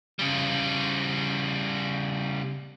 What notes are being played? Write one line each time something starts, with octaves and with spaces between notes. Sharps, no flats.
C#3 G3